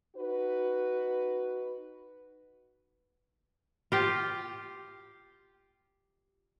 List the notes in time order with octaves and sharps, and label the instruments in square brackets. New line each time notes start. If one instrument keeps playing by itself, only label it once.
[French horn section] D#4 F#4 B4
[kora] F4 G4